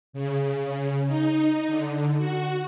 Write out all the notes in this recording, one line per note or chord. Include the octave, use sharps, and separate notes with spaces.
C#3
D#4
D3
F#4